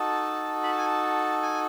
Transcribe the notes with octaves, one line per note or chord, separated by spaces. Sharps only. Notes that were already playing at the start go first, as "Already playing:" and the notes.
Already playing: D#4 F#4 A4 A5
B5
A5
G#5
A5
G#5